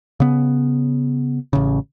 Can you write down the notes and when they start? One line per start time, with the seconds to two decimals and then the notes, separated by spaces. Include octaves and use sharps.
0.20 C#3 B3
1.53 A1 C#3